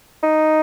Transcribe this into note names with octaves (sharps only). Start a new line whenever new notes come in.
D#4